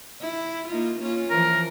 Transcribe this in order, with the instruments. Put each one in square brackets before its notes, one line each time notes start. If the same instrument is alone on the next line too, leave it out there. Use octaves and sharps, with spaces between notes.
[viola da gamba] E4
A#3 D#4 F4
A#3 C#4 F4
[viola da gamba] E3 F3 [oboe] A#4